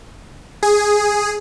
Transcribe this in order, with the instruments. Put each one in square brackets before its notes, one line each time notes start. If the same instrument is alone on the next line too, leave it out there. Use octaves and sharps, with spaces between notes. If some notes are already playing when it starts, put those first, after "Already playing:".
[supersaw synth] G#4